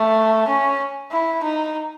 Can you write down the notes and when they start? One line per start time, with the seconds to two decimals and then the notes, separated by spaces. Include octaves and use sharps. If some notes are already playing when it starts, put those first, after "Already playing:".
Already playing: A3
0.48 C#4
1.11 E4
1.43 D#4